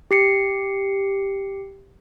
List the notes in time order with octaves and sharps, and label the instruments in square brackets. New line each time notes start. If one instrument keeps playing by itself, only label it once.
[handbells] G4 C7 C#7